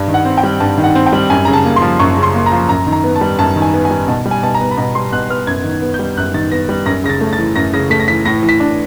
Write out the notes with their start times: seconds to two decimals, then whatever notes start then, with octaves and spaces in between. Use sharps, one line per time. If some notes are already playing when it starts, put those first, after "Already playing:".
Already playing: G2
0.08 D#3
0.14 F#5
0.25 C4
0.38 G5
0.43 G3
0.60 G2 A5
0.78 D#3
0.84 F#5
0.95 C4
1.06 G5
1.13 G3
1.30 F#2 G#5
1.45 C#3 A#5
1.53 A5
1.65 A#3
1.76 C6
1.82 F3
1.99 F#2 C#6
2.17 C#3
2.23 C6
2.34 A#3
2.46 A#5
2.52 F3
2.69 F#2 A#5
2.87 D#3
2.92 A#5
3.04 B3
3.16 A5
3.21 G3
3.39 F#2 A5
3.56 D#3
3.62 G#5
3.74 B3
3.85 G#5
3.91 G3
4.08 B2 A5
4.25 G3
4.31 G#5
4.43 B2 A5
4.54 A#5
4.60 B3
4.71 B5
4.77 B2 A#5
4.95 G3 C6
5.13 B2 F#6
5.30 B3 F6
5.47 F#2 G#6
5.64 D#3
5.82 B3
5.94 G6
5.99 G3
6.17 F#2 F#6
6.34 D#3 A6
6.52 B3 A#6
6.69 G3
6.86 F#2 A#6
7.04 C#3 A#6
7.09 A6
7.21 A3
7.33 A6
7.38 E3
7.56 F#2 A#6
7.73 C#3 A#6
7.90 A3 B6
8.00 A#6
8.08 E3 B6
8.25 A2 A#6
8.43 E3
8.49 B6
8.60 D4